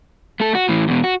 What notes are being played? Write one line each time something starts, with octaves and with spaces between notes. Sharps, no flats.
A3 A4
F#4
A2 E3
E2 B2
F#4